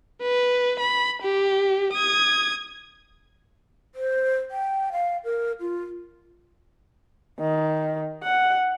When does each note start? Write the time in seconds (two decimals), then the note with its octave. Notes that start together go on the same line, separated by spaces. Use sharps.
0.22 B4
0.80 B5
1.22 G4
1.93 D#6 G#6
3.95 C5
4.51 G5
4.92 F5
5.24 A#4
5.60 F4
7.40 D#3
8.23 F#5